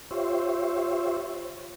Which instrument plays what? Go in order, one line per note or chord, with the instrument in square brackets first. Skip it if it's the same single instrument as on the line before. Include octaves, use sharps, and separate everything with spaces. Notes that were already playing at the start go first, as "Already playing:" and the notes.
[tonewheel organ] F4 G4 C5 C#5 E5